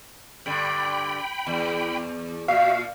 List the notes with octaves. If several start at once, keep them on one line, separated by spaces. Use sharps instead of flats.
G2 D3 G5 B5
E2
A#2 F#4 E5 F5